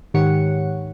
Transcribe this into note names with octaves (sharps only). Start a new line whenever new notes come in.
G#2 D#3 G4 C#5 F#5 C#7